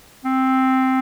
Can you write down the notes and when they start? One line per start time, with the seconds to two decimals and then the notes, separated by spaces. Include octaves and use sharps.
0.25 C4